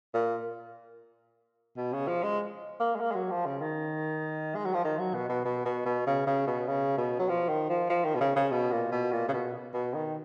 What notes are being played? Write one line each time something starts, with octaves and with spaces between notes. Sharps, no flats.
A#2
B2
C#3
F3
G#3
A#3
G#3
A#3
G#3
F#3
F3
C#3
D#3
G#3
F#3
F3
D#3
F#3
B2
B2
B2
B2
B2
C#3
C#3
B2
C#3
B2
F#3
F3
D#3
F3
F3
D#3
B2
C#3
C#3
B2
A#2
B2
A#2
C#3
B2
B2
D#3